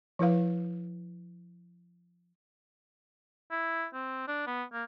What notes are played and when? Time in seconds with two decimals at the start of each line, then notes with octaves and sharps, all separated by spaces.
0.19 F3 E4 B4 F5
3.51 E4
3.93 C4
4.28 D4
4.47 B3
4.73 A#3